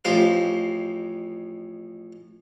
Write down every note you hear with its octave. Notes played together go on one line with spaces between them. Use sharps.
A1 F2 G4 C5 F5